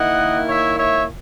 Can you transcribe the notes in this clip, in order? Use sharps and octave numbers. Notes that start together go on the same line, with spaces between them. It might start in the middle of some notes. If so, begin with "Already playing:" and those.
Already playing: D#3 A#3 E4 D#5 F#5
C#5 E5
C#5 E5